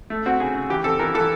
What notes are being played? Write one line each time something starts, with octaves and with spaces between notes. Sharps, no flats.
A3
C4 F#4
C#3 G#4
C#3
E3 G4
C4 A4
E3 A#4
E3 A4